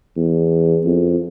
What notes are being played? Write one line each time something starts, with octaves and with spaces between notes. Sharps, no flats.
E2
F2